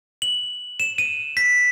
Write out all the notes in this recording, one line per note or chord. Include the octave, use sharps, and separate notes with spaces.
F#7
E7
D#7
B6